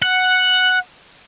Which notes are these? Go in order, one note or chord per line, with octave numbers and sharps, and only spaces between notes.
F#5